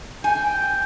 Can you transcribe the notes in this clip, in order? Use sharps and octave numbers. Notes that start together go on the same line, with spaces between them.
G5 G#5